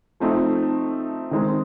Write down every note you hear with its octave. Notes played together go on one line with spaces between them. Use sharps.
F3 A3 C4 D#4
D#3 G#3 C4 D#4